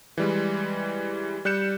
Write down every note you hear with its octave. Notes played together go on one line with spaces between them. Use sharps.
E3 G3 G#3
G3 F#6 G6 C#7 E7